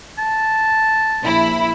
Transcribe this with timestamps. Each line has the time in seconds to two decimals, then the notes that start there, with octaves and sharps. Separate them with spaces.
0.18 A5
1.21 A#1 E4 B5